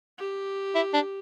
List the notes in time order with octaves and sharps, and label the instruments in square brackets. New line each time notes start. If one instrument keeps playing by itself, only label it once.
[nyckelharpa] G4
[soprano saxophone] E4
D4